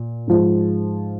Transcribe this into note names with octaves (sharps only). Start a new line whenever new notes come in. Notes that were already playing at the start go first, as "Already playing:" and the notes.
Already playing: A#2
G#2 F3 G#3